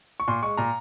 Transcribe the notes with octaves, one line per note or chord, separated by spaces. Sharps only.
C#6
A#2 C6
G#3 C#6
A#2 A#5